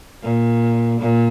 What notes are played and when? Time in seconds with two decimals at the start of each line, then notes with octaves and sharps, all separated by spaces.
0.23 A#2
1.00 A#2